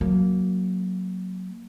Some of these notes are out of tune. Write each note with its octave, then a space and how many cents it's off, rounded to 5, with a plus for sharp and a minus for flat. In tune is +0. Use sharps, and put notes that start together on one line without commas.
F#3 +0 A#3 +0